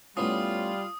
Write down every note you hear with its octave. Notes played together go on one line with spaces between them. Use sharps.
A2 G3 B3 C#4 F4 D#6